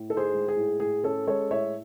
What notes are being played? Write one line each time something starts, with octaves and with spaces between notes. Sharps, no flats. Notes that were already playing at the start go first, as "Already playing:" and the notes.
Already playing: A2
D#4 A4
G#4 C5
G#3
G#4
A2
A2 G#4
C#4 A4
G#3 A4 C#5
A2 C#5 E5